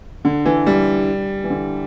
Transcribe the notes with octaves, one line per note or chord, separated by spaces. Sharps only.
D3
E3
G3
E3
D3